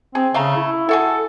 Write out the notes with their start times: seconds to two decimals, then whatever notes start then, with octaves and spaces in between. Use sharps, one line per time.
0.15 C4 G#4
0.34 C#3 A3 F5 A#5
0.56 E4
0.89 E4 F#4 G#4 A4